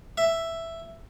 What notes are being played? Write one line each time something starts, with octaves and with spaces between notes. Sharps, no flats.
E5